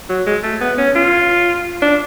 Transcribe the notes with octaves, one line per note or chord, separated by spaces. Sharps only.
F#3
G#3
A3
B3
C#4
F4
D4